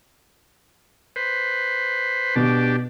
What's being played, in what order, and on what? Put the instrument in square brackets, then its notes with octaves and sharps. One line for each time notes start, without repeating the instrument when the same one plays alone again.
[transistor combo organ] B4 C5
[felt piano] B2 [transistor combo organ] D4 G4